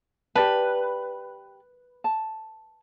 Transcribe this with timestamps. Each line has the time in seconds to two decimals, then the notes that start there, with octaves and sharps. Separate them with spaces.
0.35 G4 B4 D5 A5
2.04 A5